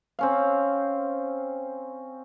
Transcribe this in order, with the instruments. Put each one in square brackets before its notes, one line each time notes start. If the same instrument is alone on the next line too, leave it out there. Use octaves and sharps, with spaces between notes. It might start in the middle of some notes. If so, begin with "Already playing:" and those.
[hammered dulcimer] C4 C#4 F5